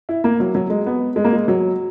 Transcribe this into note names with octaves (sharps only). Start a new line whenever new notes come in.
E4
A#3
F#3
F#3
G#3
B3
G#3
A#3
G#3
F#3